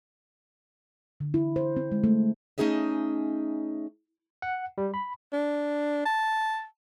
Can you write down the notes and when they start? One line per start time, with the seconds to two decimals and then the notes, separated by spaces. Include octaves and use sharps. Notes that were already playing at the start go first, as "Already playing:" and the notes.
1.20 D3
1.34 E4
1.56 C5
1.76 C4
1.92 G#3
2.04 A3
2.58 A3 C#4 D#4 G#4 D#5 E5
4.42 F#5
4.78 G3
4.94 B5
5.32 D4
6.05 A5